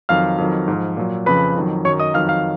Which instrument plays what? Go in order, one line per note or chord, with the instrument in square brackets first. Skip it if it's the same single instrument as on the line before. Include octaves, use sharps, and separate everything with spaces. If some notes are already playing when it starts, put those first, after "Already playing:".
[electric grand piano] F2 D#3 F#3 F5 F6
F2 D#3 F#3
G#2
F3
A#2 F#3
F2 C#3 F3 B4 B5
F2 D#3 F#3
F#2 D#3 F#3 C#5 C#6
D#5 D#6
F2 D#3 F#3 F5 F6
F5 F6